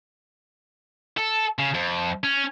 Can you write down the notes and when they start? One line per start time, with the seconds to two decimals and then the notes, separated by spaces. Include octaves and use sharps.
1.18 A4
1.59 C#3
1.74 F2
2.24 C#4